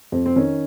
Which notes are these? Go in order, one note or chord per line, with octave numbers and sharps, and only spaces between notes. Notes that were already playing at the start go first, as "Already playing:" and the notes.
F2
C4
D#3 C#4